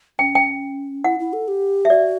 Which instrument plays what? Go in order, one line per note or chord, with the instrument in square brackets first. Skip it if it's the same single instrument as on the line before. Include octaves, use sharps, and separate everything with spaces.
[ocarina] C#4 [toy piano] G5
[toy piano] G5
[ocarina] E4 [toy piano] F#5
[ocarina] E4
A4
G4
[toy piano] E5
[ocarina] F#4 [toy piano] D5